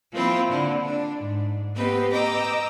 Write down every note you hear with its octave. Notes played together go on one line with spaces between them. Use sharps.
F3 A#3 C4 E4 F4
D3 E4
D4
G#2
B3 C4 G4 B4 D#5
D#5 G5 A#5 D6 E6